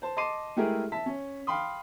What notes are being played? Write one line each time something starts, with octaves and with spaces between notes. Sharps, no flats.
C5 A5
D#5 A5 C6 D6 C7 D#7
G#3 A3 E4 G4 G#4 A#4
E5 A5 B6
C#4
F5 G5 B5 C6 D#6